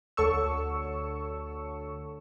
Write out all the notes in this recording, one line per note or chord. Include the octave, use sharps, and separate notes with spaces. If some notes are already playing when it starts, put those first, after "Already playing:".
D2 A4 C#5 C#6 E6